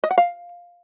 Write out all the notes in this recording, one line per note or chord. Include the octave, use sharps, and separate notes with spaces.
D#5
F#5
F5